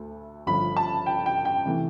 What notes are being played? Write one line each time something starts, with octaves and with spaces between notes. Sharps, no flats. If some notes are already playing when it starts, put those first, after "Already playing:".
Already playing: D2 A3
G1 G2 F3 B5
A5
G5
G5
G5
C3 E3 A3